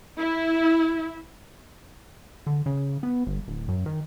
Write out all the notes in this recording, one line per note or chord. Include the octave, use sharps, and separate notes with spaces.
E4
D3
C#3
B3
G1
D1
F#2
D#3